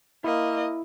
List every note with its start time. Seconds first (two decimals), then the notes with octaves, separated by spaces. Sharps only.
0.24 A#3 E4 D#5